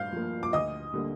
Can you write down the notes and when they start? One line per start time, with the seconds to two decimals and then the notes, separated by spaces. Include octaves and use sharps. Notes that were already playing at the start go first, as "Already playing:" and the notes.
Already playing: G2 F5 F6 G6
0.12 F3 A#3
0.43 D6
0.53 D2 D#5 D#6
0.94 D3 G3 A#3